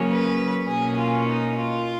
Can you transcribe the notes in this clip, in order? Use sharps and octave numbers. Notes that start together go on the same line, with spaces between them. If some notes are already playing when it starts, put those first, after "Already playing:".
Already playing: C#3 F#3 A#3 C#4
B4
B2 A#3 C#4 G#4
F4
D#4
F4